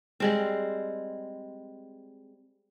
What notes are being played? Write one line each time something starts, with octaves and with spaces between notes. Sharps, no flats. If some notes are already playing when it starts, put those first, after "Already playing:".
G3 G#3 C4